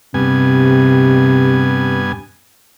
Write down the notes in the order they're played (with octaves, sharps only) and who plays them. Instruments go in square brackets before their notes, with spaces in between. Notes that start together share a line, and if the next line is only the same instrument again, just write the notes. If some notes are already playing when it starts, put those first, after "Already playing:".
[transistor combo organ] G2 B3 G#5 [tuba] C3